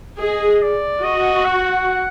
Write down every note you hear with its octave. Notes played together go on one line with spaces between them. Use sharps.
G#4 D#5
D5
F#4 D#5
F#5